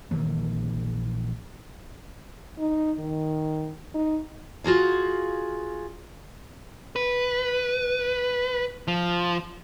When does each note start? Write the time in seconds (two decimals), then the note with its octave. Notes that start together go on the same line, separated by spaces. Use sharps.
0.11 A#1 D#3 E3 A#3
2.59 D#4
2.99 D#3
3.95 D#4
4.64 F4 F#4 G#4 F5
6.96 B4
8.88 F3